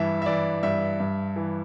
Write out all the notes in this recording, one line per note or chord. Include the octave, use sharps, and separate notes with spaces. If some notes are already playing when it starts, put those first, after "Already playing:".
Already playing: G2 E3 E5
E5
E3 D5
G2 E5
G2
E3